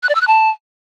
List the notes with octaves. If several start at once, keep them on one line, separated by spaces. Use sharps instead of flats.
F#6
D5
E6
F#6
A5